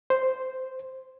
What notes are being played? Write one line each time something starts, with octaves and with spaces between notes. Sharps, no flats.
C5